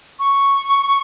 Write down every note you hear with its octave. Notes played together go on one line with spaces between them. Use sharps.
C#6